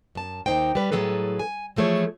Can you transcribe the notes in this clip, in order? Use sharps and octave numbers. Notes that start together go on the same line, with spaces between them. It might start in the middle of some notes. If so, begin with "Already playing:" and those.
F#2 A5
D#2 C#3 D#4 C5 G5
G3 B4
A2 F#3 A#3 G#4 A4 B4
G#5
E3 F3 A3 G#4 C#5